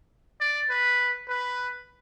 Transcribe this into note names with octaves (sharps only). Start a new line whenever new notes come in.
D5
B4
B4